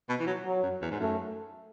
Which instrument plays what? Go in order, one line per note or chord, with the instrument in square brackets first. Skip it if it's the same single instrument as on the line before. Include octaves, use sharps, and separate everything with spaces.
[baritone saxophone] B2
E3
F#3
[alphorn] F#3
[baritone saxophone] F#2
E2
G#2
[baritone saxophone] F#2 [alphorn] A3